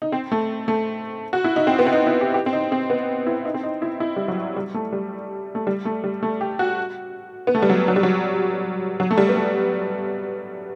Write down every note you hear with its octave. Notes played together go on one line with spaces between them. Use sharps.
D#4
C4
A3
A3
F#4
E4
D#4
C4
B3
C4
D#4
E4
G4
G4
C4
D#4
C4
B3
E4
D#4
C4
D#4
E4
E4
G3
F#3
G3
A3
G3
A3
G3
A3
G3
A3
G4
F#4
B3
A3
G3
F#3
F#3
G3
F#3
F#3
A3
G3
B3
A3